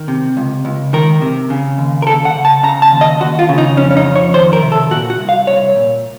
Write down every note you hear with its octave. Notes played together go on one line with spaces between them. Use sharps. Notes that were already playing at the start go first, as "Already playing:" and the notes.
Already playing: D#3
C3
C#2
C#2
D#3 A#4
C3
C#3
D#2
A#4
D#2 A4
F#5
C#3
A5
C#3 A#5
A5
D#2
D#5
D#2 F#4
F4
C#3
D#4
F2 C#4
C#4
D#4
F2
C#5
D#3 C5
A#4
C3
A4
A#2 F#4
F#4
C2
F5
C2 C#5
A#2